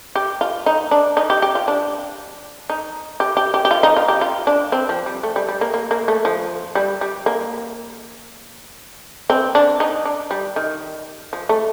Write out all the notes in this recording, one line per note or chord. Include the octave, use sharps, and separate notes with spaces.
G4
F4
D#4
D4
D#4
G4
G4
F4
D4
D#4
G4
G4
G4
G4
F4
D#4
F4
G4
F4
D4
C4
F3
G3
A3
G3
G3
A#3
A#3
A#3
A3
F3
G3
G3
A#3
C4
D4
D#4
D4
G3
D#3
F3
A3